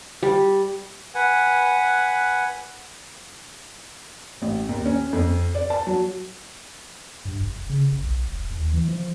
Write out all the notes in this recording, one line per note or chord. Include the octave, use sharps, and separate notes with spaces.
G3
B4 F#5 G#5
A1
D#2
C#4
F2
D5
A5
F#3
G2
F1
C#3
F#1
B1
E1
D#2
E3
F3